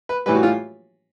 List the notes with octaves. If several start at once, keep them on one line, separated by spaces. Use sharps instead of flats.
B4
A2 E3 G3 B4
F#4
F4